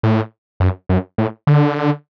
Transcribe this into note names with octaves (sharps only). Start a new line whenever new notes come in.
A2
F#2
F#2
A2
D3